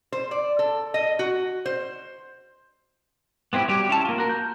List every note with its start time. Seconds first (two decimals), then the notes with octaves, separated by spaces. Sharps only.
0.12 C5
0.31 D5
0.59 A4
0.94 D#5
1.19 F#4
1.66 C5
3.53 B3 C4 E4 G4
3.68 F#3 G3 G4
3.89 C#4 E4 A5
4.05 A#3 F4
4.18 F#4 A#4
4.29 G6